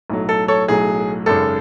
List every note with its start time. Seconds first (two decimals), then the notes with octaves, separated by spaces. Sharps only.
0.10 B1 A2 F#3
0.29 A4
0.48 A4 C#5
0.68 B1 A2 F#3 G#4
1.26 G#1 F#2 C#3 A4